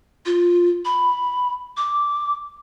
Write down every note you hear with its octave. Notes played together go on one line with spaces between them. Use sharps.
F4
B5
D6